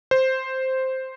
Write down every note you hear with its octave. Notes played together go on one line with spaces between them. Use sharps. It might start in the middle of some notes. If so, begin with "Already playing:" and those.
C5